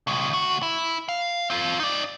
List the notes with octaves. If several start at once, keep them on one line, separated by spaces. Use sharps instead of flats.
C#2 B2
D2 F#4
E4
F5
C4 F4
D#4 D5